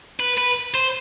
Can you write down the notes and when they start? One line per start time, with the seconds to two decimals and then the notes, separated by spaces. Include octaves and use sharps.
0.20 B4
0.38 B4
0.74 C5